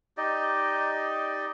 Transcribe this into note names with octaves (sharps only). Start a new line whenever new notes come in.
D#4 G4 D5 D#5